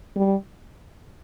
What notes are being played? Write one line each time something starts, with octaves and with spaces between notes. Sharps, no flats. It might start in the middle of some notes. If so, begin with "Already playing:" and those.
G3